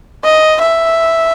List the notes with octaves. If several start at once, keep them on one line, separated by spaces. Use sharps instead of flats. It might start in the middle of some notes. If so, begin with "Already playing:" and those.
D#5
E5